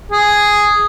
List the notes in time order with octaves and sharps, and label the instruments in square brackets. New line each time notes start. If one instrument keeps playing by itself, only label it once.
[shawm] G#4